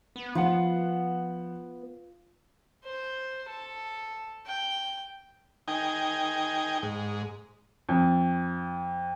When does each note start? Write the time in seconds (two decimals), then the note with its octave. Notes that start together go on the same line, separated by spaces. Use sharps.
0.16 B3
0.35 F3 F4 F#5
2.84 C5
3.49 A4
4.47 G5
5.68 D#4 G5 G#5
6.83 G#2
7.89 F2